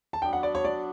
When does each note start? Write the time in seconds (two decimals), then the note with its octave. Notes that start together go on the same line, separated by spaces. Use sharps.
0.13 A5
0.22 F#3 B3 D4 F#4 G5
0.33 F#5
0.43 D5
0.55 C#5
0.65 D5